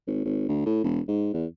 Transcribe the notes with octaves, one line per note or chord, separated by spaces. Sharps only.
G#1
G#1
D2
A2
E1
G#2
E2